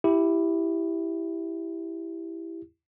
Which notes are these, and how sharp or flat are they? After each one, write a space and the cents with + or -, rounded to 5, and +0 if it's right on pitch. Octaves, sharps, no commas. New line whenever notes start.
E4 +0 G4 +0